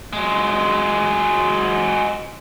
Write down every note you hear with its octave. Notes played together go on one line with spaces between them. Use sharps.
F#3 G#3